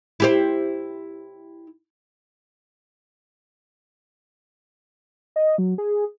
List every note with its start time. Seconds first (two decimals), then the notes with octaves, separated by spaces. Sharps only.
0.20 E4 G4 C5
5.36 D#5
5.58 F#3
5.78 G#4